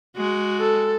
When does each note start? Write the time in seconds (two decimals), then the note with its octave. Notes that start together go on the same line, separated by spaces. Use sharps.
0.16 G#3 F#4
0.60 A4